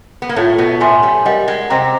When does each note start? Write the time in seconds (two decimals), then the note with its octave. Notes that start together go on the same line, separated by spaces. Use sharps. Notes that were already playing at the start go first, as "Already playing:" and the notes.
0.22 B3
0.29 A#3
0.36 A2 A3 F4 A4 C#5
0.58 B2 B3
0.80 A2 A3 C#5 E5 G#5 C6
1.03 G3
1.25 G3 A#4 D#5 F#5
1.48 G#3
1.70 C3 C4 C5 D#5 G5 A#5